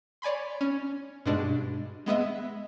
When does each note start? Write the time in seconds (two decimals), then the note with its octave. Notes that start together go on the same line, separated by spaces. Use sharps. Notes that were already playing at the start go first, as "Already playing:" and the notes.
0.22 C#5 D5 G#5 B5 C6
0.61 C#4
1.26 G2 B2 G#3 D4
2.06 G#3 B3 D#5 E5